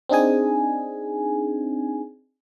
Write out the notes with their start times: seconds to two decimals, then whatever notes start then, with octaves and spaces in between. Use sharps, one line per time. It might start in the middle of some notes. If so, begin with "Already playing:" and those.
0.09 C4 D4 D#4 G#4 G#5